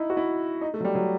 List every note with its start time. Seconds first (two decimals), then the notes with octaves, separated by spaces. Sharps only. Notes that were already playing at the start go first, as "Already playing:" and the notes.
Already playing: D#4 E4
0.10 F#4
0.17 E4
0.61 D#4
0.74 A3
0.80 F#3
0.85 G3
0.95 F#3